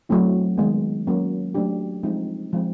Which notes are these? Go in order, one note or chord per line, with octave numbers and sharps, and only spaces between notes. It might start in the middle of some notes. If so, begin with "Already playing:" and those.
F#3 A3 C4 E4
D#3 G#3 B3
F#3 A#3 C#4
F#3 A3 D4 G4
F3 G#3 C4 D#4
F3 G#3 C4